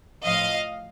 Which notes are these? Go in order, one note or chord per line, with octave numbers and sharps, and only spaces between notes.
A2 F3 D#5 F5